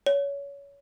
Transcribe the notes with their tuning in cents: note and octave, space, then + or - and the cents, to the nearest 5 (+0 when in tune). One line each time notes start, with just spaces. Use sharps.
C#5 +25